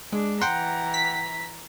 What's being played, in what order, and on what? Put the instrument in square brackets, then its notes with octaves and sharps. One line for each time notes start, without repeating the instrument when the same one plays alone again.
[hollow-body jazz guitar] G#3 [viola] D4
[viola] E3 A#5 [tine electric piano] F#5 G5 [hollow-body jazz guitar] C6
[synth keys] B6